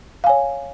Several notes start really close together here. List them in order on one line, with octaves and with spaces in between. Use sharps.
F5 G#5 C#5